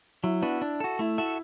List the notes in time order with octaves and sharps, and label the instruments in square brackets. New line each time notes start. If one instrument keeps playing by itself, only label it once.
[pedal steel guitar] F#3 [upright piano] E4
[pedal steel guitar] B3 D4 F#4 B4
D4
F#4 A4
[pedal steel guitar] A3 [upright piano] E4
[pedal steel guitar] F#4 A4 E5